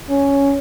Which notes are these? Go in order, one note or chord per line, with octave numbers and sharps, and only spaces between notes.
C#4